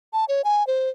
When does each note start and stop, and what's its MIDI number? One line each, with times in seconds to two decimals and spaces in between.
0.13 0.25 81
0.28 0.42 73
0.44 0.66 80
0.67 0.89 72